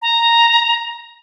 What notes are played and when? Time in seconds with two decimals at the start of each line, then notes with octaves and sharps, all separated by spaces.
0.02 A#5